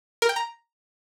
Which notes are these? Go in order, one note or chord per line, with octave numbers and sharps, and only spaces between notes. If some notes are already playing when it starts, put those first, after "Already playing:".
A#4
G5
A#5